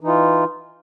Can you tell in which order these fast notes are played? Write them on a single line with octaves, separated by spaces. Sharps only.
E3 D#4 F4